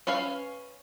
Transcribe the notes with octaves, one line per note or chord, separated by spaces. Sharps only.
C#4 B4 C#5 F5